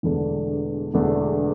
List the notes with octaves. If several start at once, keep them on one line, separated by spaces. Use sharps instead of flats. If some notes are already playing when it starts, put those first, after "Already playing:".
E1 E2 D3 A3 D4
E1 E2 D3 A3 D4